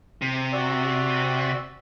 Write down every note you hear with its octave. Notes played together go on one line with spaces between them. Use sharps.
C3
F#4 D5 E6